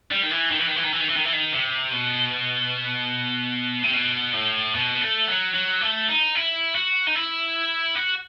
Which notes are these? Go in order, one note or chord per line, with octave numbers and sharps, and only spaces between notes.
G3
D#3
E3
D#3
E3
D#3
E3
D#3
E3
D#3
E3
D#3
E3
D#3
C3
B2
C3
B2
A2
B2
B3
A3
F#3
F#3
A3
D#4
E4
F#4
D#4
E4
F#4